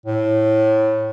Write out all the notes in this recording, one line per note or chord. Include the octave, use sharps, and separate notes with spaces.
A2